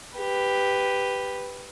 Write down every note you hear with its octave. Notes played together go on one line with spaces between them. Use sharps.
G4 B4